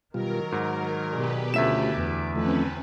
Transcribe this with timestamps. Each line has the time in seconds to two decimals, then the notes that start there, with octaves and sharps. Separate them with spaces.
0.14 B2 D#3 F#3 G3 F4 A#4
0.52 G#2 F#4
1.13 B2 G4 G#4 B4 D5
1.54 D2 A3 C#4 F4 E5 E7
1.94 E2 D6
2.36 D#3 F3 A3 C4 C#4 B4